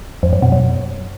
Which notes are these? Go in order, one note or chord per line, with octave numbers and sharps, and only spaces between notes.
F2
F#2
B2
F#2